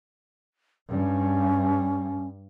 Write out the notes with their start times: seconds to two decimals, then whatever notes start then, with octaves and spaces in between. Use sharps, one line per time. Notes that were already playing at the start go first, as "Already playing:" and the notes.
0.90 G2 C#4